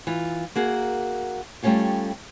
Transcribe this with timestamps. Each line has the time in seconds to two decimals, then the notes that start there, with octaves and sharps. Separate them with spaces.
0.07 E3 F4
0.56 A#3 F#4 G#4 A#4
1.63 G3 A3 A#3 C#4 F4 G4